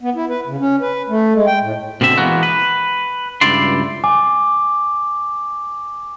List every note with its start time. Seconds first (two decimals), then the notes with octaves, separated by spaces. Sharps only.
0.01 B3
0.15 E4
0.30 B4
0.47 C#3
0.60 C#4
0.81 B4
1.09 A3
1.34 G#3
1.47 G5
1.62 A2
2.01 B2 D3 C4 E5
2.17 E3 G#3 A#3 B3 F#4
2.43 B4
3.41 C#2 G2 E4 D5 C6
4.04 G#5 D6